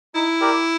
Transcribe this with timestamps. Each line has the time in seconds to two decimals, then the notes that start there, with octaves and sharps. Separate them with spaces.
0.14 D#4 E4
0.40 G4 A#4 D5